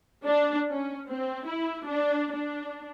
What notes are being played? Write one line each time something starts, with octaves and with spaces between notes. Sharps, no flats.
D4
C#4
C4
E4
D4
D4